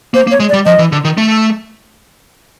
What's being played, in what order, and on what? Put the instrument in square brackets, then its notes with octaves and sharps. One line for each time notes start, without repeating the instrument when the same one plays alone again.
[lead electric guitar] A#3 [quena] C5
[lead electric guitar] A#3
[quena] C#5
[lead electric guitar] G#3
[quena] D5
[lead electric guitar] G3
[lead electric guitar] F3 [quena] D#5
[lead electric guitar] E3
D3
D#3
A3